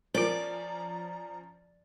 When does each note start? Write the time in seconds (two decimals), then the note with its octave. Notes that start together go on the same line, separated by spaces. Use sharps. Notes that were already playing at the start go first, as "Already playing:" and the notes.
0.15 F3 C#4 F4 A#4 D5 A#5